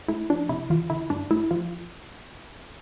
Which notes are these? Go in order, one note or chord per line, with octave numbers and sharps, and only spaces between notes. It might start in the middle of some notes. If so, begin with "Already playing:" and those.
A3 E4
F3 D4
C3 E4
E3 F4
D3 E4
G2 D4
A3 E4
F3 F4